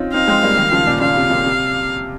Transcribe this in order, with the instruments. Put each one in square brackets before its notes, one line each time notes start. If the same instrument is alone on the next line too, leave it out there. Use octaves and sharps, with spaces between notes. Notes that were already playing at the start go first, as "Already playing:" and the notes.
Already playing: [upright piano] C4 C#4 D#4 F4
[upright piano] C4 D#4 [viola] F5
[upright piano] G#3 C4
G3 A#3
D#3 G3
C#3 F3
A#2
[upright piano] A#2 C#3 [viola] F5
[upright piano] C3
A#2
C3